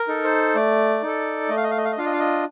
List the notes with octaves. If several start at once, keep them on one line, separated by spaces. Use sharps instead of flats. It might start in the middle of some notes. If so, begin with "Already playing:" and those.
Already playing: A#4
D#4 A4
C5
A3 D5
D#4 A4
A3 D#5
F5
D#5
F5
D#5
F5
D#5
D4 F4 F5
D#5
F5
D#5